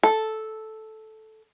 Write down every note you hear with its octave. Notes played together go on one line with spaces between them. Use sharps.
A4